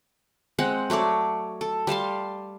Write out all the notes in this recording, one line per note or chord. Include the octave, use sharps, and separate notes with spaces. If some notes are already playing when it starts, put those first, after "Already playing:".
G#3 C4 F#5
F#3 A3 C#5 D5
A4
G3 F5 A5 C6